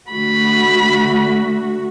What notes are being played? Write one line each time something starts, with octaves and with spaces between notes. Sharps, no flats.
D3 A3 F#4 B5